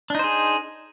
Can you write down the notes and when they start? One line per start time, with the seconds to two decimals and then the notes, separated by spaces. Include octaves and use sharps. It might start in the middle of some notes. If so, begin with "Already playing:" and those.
0.10 D4
0.15 D#4
0.19 C5
0.24 G#4